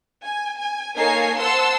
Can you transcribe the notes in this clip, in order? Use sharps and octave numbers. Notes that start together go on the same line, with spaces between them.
G#5
G#5
A#3 D#4 A4 C#5 G#5 C7
C5 F#5 A5 C6 E6